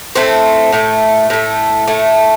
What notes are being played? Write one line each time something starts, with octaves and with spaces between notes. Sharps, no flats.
A2 A3 C4
A2 A3
A2 A3
A2 A3